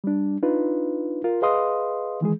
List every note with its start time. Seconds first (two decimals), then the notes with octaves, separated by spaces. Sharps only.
0.04 G3 D4
0.42 D4 D#4 F4 B4
1.24 F4 A#4
1.42 G#4 B4 D#5 F5 C6 D#6
2.21 D#3 E3 G#3 G#4